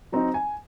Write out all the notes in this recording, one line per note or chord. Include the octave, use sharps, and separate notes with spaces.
F#3 C4 D#4 A#5
G#5